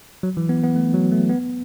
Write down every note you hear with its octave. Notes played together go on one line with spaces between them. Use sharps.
F#3
E3
B3
B3
A3
F#3
A3
B3